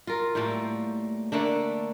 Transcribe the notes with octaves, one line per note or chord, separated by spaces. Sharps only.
F4 A#4
A2 G3 A3 A#3
D3 A3 A#3 D4